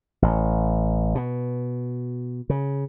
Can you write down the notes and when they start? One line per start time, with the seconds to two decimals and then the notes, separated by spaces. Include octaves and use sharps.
0.22 A1
1.15 B2
2.50 C#3